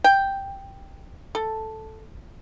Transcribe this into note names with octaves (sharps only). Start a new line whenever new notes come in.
G5
A4